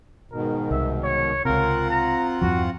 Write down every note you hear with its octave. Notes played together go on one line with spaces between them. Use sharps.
G#2 B2 D#3 A#4
C2 E5
C#5
C#2 C3 C4 F4 A#4 F#5
A#5
E2 G2 F3 F#4